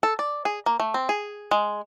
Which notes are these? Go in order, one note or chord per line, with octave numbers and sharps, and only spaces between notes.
A4
D5
G#4
A#3
A3
C4
G#4
G#3